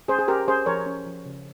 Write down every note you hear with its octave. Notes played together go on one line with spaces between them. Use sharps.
C#4 G#4 C5
G#4
C#4 G4 A#4
C#4 G#4 C5
F3 A#4 C#5
C#4
F3
C#3